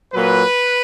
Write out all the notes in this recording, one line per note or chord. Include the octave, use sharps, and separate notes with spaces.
A#2 F#3 A#3 B4